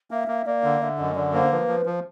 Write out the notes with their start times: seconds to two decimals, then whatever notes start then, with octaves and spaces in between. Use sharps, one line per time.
0.11 A#3 E5
0.28 A#3
0.46 A#3 D5
0.64 D3
0.81 D3 E5
0.99 F#2 D#5
1.16 D3 D5
1.33 A#3 C5
1.51 F3 B4
1.68 F3
1.86 F3